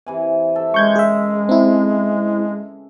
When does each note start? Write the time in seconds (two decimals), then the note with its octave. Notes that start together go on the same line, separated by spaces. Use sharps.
0.07 C3 E3 G#5
0.56 A4 E5
0.74 C#3 G#3 A#4 C#6 G6 G#6
0.96 G#4 E5
1.49 C4 E4 A4